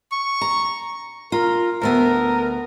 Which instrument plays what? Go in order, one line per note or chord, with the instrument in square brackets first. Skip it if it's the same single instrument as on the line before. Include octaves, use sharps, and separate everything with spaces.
[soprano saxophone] C#6
[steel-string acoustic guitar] A#5
[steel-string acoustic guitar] F4 [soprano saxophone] A#4
[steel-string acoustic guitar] D2 A3 B3 [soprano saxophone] A#4